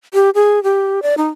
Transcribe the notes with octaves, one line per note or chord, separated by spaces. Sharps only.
G4
G#4
G4
D5
D#4